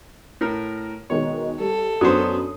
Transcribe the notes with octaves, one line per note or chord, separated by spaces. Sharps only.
A2 A#4
B2 D#3 G#3 C#5
G3 A4
F#2 F#3 B3 D4 C5 D#6